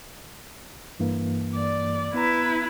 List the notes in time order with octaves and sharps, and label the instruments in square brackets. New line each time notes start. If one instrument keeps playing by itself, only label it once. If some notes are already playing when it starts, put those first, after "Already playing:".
[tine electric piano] G2 E3 A#3
[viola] D5
[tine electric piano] B3 A#5 [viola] E4 B4